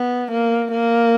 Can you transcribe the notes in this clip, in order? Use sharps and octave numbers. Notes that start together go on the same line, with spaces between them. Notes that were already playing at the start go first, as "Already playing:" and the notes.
Already playing: B3
A#3
A#3